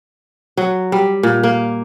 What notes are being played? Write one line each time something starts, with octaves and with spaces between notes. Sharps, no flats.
F#3
G3
A#2
A#3